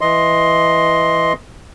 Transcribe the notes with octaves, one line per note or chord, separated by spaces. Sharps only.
E3 D#5 C6